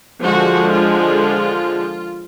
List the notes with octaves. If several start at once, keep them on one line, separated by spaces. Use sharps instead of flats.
D3 F3 G#3 F#4
F4